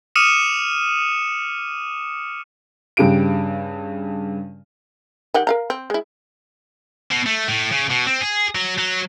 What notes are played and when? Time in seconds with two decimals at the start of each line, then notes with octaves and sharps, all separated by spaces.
0.15 D6 D#6 F6 C#7 D#7 E7
2.97 G2 C#3 G4 D7
5.34 D#3 G4 F#5
5.47 A#4 F5 A#5
5.70 C4
5.90 G#3 E4
7.11 B2
7.26 A3
7.48 A2
7.72 C#3
7.91 B2
8.07 C4
8.21 G#4
8.55 F#3
8.78 F#3